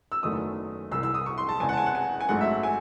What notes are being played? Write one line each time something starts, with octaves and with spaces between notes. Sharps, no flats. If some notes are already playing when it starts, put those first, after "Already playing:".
E6
F#1 E2 D#3 F#3 A3 D#6
C2 C3 E3 E6
E6
D#6
C#6
C6
A5
E2 C#3 G#3 G#5
F#5 A5
G#5
F#5
G#5
G#5
A1 G#2 F#3 A3 F#5
E5
G#5